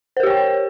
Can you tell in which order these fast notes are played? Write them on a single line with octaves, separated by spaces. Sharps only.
C5 A#4 G4 C#5 G5